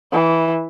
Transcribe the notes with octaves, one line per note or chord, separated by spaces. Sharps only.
E3